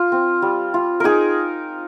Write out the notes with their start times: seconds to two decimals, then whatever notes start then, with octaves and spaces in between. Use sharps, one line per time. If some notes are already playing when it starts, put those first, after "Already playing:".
Already playing: F4
0.12 C4
0.42 G3
0.74 F4
1.00 D#4 G#4 A#4